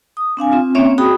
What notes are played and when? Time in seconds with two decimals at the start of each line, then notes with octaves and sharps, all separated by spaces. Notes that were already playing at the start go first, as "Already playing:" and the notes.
0.17 D#6
0.37 C4 D4 F5 G#5
0.52 C4 F4
0.75 A#3 C4 C#4 C#5 E5
0.98 F#4 G#4 G5 B5 D#6